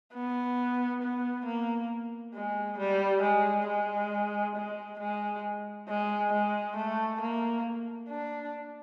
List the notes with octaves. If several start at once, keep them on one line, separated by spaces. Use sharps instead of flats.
B3
B3
A#3
G#3
G3
G#3
G#3
G#3
G#3
G#3
G#3
A3
A#3
D4